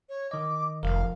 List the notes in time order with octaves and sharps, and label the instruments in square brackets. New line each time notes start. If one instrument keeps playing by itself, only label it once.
[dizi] C#5
[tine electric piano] D#3 D#5 [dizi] D6
[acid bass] F1 [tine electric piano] F3 A#4 [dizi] F5